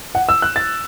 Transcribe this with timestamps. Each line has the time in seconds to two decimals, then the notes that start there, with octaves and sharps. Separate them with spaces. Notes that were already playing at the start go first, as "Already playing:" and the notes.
0.15 F#5
0.29 E6
0.42 F#6
0.56 A6